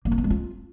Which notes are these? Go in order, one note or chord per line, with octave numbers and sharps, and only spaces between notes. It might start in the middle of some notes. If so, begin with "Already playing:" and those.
A#3
E4
B3
G#3
F4